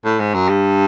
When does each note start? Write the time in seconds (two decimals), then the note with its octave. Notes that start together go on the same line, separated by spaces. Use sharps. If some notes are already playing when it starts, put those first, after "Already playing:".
0.05 A2
0.20 G#2
0.34 F#2
0.49 G2